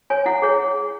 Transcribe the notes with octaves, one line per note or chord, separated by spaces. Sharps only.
C#5 G#5
E4 F#5
G#4 C#5